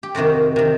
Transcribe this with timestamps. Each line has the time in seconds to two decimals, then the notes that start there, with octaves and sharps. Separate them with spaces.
0.03 G4
0.15 F2 C3 D#3 F#4
0.56 C3 D#3